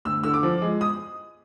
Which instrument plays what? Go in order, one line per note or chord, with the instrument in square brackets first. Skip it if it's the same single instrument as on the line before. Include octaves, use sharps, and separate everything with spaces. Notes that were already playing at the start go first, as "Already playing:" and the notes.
[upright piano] D2 E6
D3 E6
D6
F3
G#3
D#6